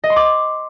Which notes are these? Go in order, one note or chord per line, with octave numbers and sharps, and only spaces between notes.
D#5
C6
D6